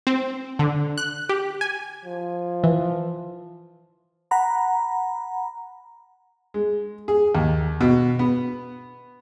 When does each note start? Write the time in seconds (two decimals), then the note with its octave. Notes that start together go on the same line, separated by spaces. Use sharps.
0.07 C4
0.59 D3
0.98 F#6
1.29 G4
1.61 G#5
2.05 F3
2.64 E3
4.31 F#5 A#5 B5
6.54 G#3
7.08 G#4
7.35 D#2
7.81 B2
8.19 B3